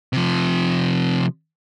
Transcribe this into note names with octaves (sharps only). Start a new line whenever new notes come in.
C3 F3